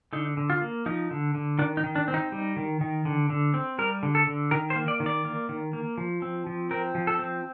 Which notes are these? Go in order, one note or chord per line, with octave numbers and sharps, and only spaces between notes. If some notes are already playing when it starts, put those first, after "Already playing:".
D3 D#4
D3
F4
A#3
F3 D#4
D3
D3
D#3 D4
D#4
D#3
D4
C4
D#4
G3
D#3
D#3
D3
D3
C4
G3 A#4
D3
A4
D3
D#3 A#4
C5
A#3
D5
D#3
D5
A#3
D#3
A#3
F3
C4
F3
C4 A#4
F3
A4
C4